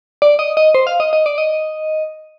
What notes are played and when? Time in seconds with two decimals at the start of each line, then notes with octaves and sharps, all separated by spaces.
0.22 D5
0.39 D#5
0.57 D#5
0.75 C5
0.87 F5
1.00 D#5
1.13 D#5
1.26 D5
1.38 D#5